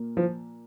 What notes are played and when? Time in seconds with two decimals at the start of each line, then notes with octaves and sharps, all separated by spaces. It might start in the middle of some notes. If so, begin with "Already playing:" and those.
Already playing: A#2 A#3
0.17 F3